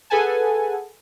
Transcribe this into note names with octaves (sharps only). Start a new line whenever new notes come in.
G#4 A4 B4 F#5 G#5 A5